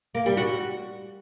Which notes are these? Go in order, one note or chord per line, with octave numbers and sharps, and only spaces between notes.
A#3
G3
F#4